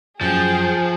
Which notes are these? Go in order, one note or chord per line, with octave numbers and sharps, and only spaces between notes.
F#2 F3 G#4 G5